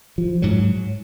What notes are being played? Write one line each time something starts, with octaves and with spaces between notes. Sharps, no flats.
F3
G#2 F#3